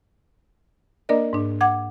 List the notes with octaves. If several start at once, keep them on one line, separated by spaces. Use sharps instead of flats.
A#3 D4 A#4 D5 D#5
G#2 D4
F#5 D6 G#6